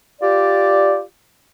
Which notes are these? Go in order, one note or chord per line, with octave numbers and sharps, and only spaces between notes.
F4 G4 D5